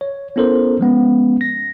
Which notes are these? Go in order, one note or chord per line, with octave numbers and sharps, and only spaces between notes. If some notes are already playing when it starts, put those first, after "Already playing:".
C#5
B3 C#4 E4 A4 A#4 C5
F3 G#3 B3 C#4
A#6